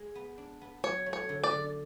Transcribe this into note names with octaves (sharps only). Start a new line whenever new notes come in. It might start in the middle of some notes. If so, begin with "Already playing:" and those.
Already playing: G#3
B3
D4
B3
F#3 C#5
A3
C#5
D3
D5
D3